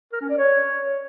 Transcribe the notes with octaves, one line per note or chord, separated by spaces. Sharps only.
A#4
C#4
D5
C#5